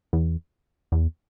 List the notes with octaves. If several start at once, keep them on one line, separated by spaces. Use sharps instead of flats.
E2
E2